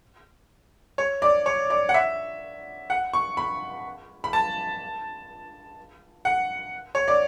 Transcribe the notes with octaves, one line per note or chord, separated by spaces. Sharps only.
C#5
D5
C#5
D5
F#5
E5
F#5
C#6
B5
B5
A5
F#5
C#5
D5